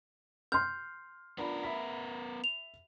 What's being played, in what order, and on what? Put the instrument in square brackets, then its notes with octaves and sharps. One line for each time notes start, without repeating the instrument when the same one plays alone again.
[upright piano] C6 F6 [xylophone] G6
[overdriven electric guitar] B3 A#4 [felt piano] D4 F4 B5
[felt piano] E5 B5 B6
[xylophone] F7